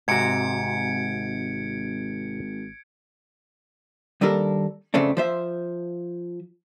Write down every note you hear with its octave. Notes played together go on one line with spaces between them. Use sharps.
G#1 G#2 C3 F#4 G#6 C#7 D7
D#2 G3 D4 A4 A#4
F2 C#3 A3 C4 D4
F3 C5 E5